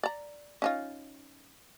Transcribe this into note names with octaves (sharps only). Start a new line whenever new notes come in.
D5 A#5
C#4 D#4 F4